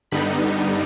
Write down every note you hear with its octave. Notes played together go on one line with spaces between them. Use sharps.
G2 D3 G3 B3 D#4 B5